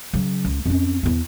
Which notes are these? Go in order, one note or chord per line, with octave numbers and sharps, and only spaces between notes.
C#3 F#3
C#2
F2 C#4
E2 B3